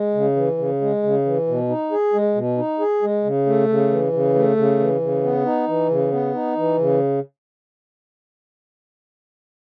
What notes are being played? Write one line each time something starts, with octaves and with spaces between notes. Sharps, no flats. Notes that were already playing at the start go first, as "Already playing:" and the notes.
Already playing: G#3
C#3
E3
C#3
G#3
C#3
E3
B2
D#4
G#4
G#3
B2
D#4
G#4
G#3
C#3
A3
C#3
E3
C#3
A3
C#3
E3
C#3
B3
D#4
E3
C#3
B3
D#4
E3
C#3